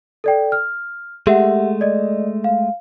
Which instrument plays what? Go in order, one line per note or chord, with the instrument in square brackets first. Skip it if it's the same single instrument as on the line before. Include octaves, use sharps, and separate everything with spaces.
[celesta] A4 D5 G5
F6
[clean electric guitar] G#3 A3 [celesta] G4 E5 F#5
[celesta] D5 D#5
F5